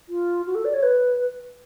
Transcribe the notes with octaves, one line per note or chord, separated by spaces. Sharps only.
F4
F#4
A4
D5
C#5
B4